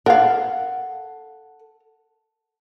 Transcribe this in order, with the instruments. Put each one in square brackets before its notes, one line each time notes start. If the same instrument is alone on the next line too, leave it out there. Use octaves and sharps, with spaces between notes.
[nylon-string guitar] A4 F#5 [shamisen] A#4 F5